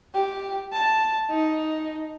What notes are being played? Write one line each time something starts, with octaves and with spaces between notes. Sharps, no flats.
G4
A5
D#4